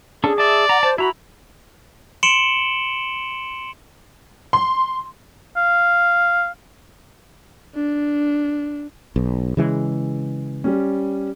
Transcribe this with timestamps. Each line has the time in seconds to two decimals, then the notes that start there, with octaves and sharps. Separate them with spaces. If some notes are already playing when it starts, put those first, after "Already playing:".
0.24 C#4 D4 G#4 A4
0.38 D5 E5 A5
0.69 F#5 A#5
0.83 C5 A5
0.98 E4 F#4 A#5 B5
2.23 C6 C#7 D7 E7 F#7 G7
4.53 C6
5.57 F5
7.75 D4
9.16 B1
9.57 C#3 E3 G#3
10.64 G3 C#4